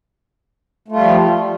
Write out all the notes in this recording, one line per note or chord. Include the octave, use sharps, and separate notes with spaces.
F3 G3 A3 F4